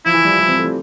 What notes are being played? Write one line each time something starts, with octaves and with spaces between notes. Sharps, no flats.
F3 E4
E3
G3
F3
G3
C4
A3
G3